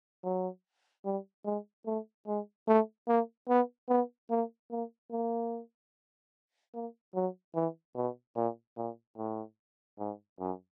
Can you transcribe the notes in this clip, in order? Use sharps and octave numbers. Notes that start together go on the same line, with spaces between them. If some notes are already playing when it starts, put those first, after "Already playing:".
F#3
G3
G#3
A3
G#3
A3
A#3
B3
B3
A#3
A#3
A#3
A#3
F#3
E3
B2
A#2
A#2
A2
G#2
F#2